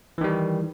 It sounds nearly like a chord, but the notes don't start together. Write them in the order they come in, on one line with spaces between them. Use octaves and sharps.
E3 D#3 G3